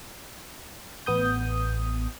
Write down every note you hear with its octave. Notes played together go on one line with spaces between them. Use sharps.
A1 B3 D#6 G6